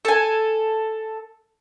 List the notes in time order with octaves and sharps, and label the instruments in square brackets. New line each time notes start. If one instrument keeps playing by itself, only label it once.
[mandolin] A4 G#5